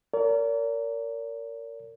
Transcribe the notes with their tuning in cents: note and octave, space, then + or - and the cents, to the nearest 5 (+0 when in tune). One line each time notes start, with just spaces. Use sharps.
A#4 -20 D5 -45